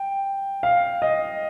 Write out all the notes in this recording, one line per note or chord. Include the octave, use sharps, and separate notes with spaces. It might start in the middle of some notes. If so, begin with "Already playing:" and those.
Already playing: G5
F5
D#5